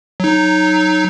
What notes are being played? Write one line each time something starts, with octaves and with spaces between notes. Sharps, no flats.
F#3 D#4